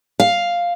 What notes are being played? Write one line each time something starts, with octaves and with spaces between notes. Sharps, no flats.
F5